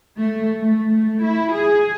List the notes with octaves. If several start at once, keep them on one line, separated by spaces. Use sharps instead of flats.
A3
A3
A3
E4
G#4